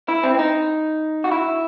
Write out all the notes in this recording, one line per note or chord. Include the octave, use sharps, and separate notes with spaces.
E4
C4
C4
D#4
F#4
E4